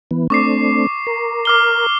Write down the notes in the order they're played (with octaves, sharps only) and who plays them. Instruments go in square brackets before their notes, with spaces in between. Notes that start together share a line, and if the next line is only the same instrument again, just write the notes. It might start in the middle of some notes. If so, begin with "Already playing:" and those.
[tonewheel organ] E3 B3
[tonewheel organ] A3 C4 D4 [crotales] C#6 D6 C7
[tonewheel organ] A#4
[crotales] D6 F6 G7